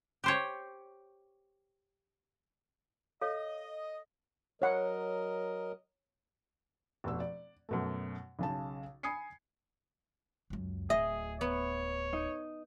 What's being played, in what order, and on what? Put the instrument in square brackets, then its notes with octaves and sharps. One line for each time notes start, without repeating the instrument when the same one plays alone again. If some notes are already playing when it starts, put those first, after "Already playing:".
[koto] G4 C5 C#5
[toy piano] A4 C#5 F5 [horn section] D#5
[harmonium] F#3 A#4 D#5 [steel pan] C#5 F#5
[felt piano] F1 B2 E6
D5
F#2 B2 A3
B1 C#3 A5
G#5 B5 D#6 G#6 C7 C#7
[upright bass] C#2 F#2
[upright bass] D1 [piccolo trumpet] G#4 [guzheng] D#5 [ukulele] E5
[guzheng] B3 [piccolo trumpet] C#5
[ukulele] D#4